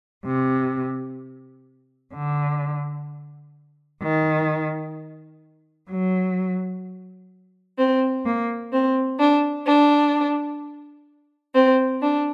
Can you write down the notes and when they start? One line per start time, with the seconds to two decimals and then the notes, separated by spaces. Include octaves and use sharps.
0.24 C3
2.13 D3
4.01 D#3
5.90 F#3
7.78 C4
8.25 A#3
8.72 C4
9.19 D4
9.67 D4
11.55 C4
12.02 D4